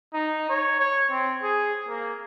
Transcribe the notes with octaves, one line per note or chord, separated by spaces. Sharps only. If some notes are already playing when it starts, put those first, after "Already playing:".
D#4
C#5
C#5
C4
G#4
A#3